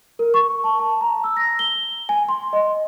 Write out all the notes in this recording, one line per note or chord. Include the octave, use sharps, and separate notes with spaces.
A#4
C#6
A5
A5
A#5
E6
A#6
G7
G#5
C6
D#5